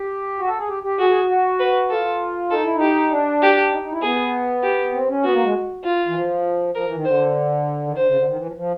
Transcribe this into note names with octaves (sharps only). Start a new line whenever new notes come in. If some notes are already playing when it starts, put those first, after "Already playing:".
Already playing: G4
F#4
A4
G#4
G4
G4
F#4 G#4
G#4
F#4
B4
F4 A4
D#4 A4
E4
D#4
G4
D4
G4
D#4
D#4
E4
B3 G#4
G4
C4
C#4
B3 F#4
A#3
G#3
F4
E3
F3
F3 A#4
E3
D#3
D3 C5
D#3
D3 C5
C#3
D3
D#3
E3
F3
F3